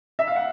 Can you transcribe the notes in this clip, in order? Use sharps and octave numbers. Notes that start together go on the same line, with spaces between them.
E5
F5
F#5